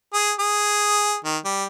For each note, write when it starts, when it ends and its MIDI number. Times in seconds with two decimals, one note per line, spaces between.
0.14 0.32 68
0.40 1.17 68
1.25 1.37 51
1.45 1.66 55